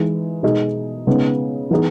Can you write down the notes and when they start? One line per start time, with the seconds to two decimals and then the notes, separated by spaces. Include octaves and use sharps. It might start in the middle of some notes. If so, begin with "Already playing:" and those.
Already playing: E3 G#3 D#4
0.43 B2 G#3 D#4 G#4 D#5
1.07 C#3 G#3 B3 D#4
1.71 E3 B3 D#4 G#4 D#5